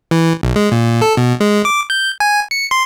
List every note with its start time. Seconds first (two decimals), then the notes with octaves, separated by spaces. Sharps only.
0.11 E3
0.43 B1
0.56 G#3
0.72 A#2
1.02 A4
1.17 B2
1.40 G#3
1.65 D6
1.90 G6
2.20 G#5
2.51 C#7
2.71 C6